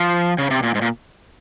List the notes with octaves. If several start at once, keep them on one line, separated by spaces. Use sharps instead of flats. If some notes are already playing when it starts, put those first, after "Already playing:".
Already playing: F3
C#3
C3
A#2
G#2
A#2